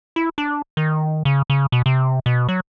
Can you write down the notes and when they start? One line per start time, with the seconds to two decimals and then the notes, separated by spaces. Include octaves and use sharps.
0.16 E4
0.38 D4
0.77 D#3
1.25 C#3
1.50 C#3
1.72 B2
1.86 C3
2.26 B2
2.49 F#3